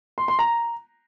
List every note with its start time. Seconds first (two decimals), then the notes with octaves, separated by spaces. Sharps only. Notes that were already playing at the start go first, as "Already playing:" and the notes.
0.18 C6
0.28 C6
0.39 A#5